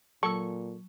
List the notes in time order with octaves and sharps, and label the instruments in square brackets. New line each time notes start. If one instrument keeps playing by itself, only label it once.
[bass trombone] A#2 [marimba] F#3 E6 [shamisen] A4 [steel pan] C#6